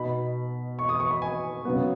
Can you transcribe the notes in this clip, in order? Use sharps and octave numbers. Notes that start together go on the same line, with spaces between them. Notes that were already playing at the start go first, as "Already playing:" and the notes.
Already playing: B2 B3 D#4 B5
C#6
D#6
C#6
B5
G#5
C#3 F#3 B3